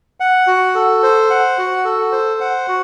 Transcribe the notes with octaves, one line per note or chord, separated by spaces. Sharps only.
F#5
F#4
A4
C5
F#5
F#4
A4
C5
F#5
F#4